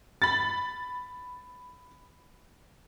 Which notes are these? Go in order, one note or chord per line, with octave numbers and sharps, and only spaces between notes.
B5 A6